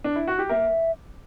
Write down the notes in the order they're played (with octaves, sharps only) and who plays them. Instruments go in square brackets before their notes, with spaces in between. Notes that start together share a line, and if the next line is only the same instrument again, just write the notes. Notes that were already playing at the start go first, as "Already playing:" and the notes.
[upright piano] D4
E4
F#4
G4
[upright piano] A#3 A#4 [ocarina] E5